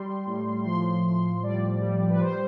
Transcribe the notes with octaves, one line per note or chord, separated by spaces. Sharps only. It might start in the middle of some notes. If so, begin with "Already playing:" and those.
Already playing: G3 C6
A2
F3 C6
A2 C6
G3 D5
G3
B4
G3 C5